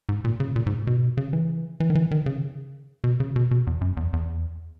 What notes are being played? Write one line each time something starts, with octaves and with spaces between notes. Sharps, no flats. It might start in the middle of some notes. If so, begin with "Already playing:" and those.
G#2
A#2
C#3
A#2
G#2
B2
C#3
E3
E3
D#3
E3
D#3
C#3
B2
C#3
B2
B2
E2
F#2
E2
E2